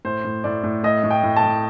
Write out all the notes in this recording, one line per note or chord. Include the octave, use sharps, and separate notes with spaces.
A2 C5
A2
A2 D5
A2
A2 D#5
A2
G5
A2
A5
A2